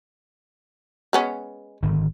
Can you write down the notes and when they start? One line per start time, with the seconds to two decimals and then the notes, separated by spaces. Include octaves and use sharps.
1.13 G#3 B3 C#4
1.83 G#1 D3 D#3